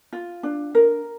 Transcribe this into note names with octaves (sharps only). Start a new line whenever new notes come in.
F4
D4
A#4